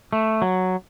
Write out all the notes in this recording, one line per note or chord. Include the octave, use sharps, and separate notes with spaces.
A3
F#3